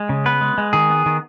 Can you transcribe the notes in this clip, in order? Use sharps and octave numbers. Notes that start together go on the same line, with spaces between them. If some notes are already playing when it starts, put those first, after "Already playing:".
Already playing: G#3
C#3
B3 B4
G#3
G#3
D#3 G#4
B3
D#3